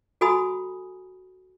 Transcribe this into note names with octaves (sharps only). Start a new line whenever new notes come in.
F#4 A4 G#5 A#5 B5 D#6